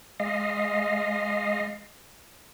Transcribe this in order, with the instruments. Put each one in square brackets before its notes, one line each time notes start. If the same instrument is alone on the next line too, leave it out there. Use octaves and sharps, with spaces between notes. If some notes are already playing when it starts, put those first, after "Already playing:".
[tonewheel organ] G#3 D#5 F5